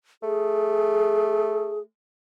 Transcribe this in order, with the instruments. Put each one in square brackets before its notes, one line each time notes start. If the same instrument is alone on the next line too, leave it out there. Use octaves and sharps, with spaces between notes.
[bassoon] A3 [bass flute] G#4